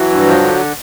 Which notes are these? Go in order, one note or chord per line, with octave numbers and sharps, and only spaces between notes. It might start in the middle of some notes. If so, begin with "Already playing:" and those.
Already playing: E3 F#3
G2
F3
D3